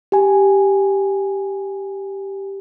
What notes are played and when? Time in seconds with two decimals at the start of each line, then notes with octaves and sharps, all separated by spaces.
0.12 G4 G#5